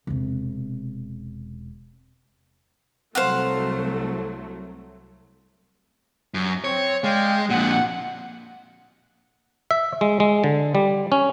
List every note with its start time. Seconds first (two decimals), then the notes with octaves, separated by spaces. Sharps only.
0.07 E1 C3
3.15 C2 F#3 A3 C5 F5 F#5
6.34 F#2
6.64 C4 C#5
7.04 G#3 D5 F5 G5
7.50 F2 A#2 F#5
9.71 E5
10.01 G#3
10.20 G#3
10.44 D3
10.75 G3
11.12 C#4